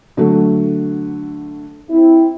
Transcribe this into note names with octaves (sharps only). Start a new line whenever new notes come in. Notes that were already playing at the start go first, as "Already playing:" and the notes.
D3 F#3 A3
C4 E4